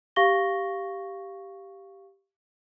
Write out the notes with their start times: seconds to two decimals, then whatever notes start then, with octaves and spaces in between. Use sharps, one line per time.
0.16 G4 F5 C#6 A#6 G7